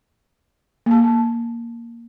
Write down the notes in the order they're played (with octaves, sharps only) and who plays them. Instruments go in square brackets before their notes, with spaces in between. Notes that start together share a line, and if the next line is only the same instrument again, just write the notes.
[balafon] A#3 A5